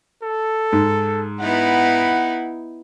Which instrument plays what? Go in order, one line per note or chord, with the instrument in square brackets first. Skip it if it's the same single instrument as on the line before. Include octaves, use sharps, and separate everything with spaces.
[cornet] A4
[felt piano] G#2
[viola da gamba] B3 D#4 E4 [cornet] F#5